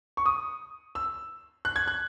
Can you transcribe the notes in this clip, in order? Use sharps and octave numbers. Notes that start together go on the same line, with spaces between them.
C#6
D#6
E6
F#6
G#6
F#6